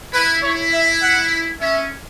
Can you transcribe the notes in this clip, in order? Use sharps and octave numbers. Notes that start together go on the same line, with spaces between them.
E4 B4
E4 C#5
E5
F#5
C#4 E5